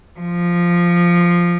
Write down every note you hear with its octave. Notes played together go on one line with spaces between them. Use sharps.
F3